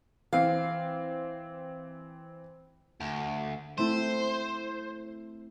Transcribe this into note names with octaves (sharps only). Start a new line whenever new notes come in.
E3 C4 F5
D2
A3 C4 E4 C5